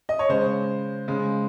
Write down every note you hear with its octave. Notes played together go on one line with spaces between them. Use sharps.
D#5
C#5
C#3 G#3 C5
C#3 G#3